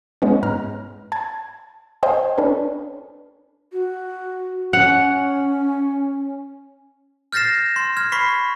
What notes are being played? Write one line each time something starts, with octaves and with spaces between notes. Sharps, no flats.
G#3 B3 C#4
G#2 A#5 F6
A5 G#6
C5 D#5 F5 G5 G#5
C#4 D4 A4 B4
F#4
C#4 F#5
F6 G6 A6 A#6 C7 E7
C6
F6 G#6
B5 C#6 B6 C7